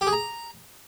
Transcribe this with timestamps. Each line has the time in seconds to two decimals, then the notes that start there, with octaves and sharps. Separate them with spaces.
0.01 G4
0.07 G#4
0.13 A#5